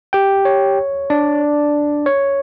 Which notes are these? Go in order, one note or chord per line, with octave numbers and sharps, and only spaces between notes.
G4 G5
C#5
D4 D5
C#5